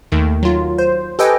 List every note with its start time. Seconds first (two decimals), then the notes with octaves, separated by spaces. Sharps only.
0.12 D#2 D#3 A3
0.43 F#3 F4
0.78 C5
1.19 G4 A4 B4 D#5 G5 G#5